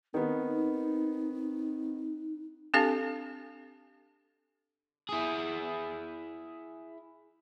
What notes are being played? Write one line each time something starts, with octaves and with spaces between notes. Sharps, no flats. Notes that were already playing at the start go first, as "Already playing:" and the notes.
D#3 B3 C4 D#4
C4 D4 G4 A4 F5 A5
E4 G#4